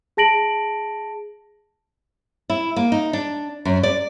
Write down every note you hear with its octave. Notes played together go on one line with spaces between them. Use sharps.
G#4 A5 A#6 D7 F#7
E4
A#3
D#4
D4
F#2
D5